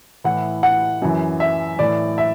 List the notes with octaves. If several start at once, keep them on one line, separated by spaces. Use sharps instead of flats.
A2 E3 F#5
F#5
F#2 E3
E5
A2 E3 D5
E5